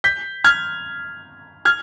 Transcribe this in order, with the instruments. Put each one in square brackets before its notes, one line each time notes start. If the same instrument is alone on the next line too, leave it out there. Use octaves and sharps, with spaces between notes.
[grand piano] G6 B6
F6 G#6
F6 G#6